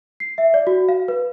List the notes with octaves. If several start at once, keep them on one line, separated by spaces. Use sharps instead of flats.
C7
E5
D5
F#4
F5
B4